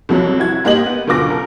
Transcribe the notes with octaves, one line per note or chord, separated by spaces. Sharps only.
C2 F2 F#3
E4 F#4 G#6
G#2 A#3 G4 D#5 F#7
B3
F#1 D2 B2 F4 D6 A#6
A#4